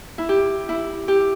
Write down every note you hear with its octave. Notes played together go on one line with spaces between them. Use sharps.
E4
G4
E4
G4